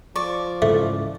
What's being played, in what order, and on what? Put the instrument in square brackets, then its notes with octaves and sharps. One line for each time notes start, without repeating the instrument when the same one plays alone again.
[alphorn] F3 [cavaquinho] D5 C#6
[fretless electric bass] G#2 C#3 E3 [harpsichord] A3